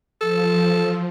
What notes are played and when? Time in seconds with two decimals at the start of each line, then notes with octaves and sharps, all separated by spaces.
0.21 F3 A4